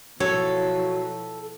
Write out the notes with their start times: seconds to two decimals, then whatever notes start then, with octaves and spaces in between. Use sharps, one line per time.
0.20 B2 F3 F#3 E4 A4 C#5